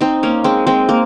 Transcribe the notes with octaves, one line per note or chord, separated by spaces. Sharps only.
C4 D#4
A#3 C#4
G#3 C4
G#3 C4
A#3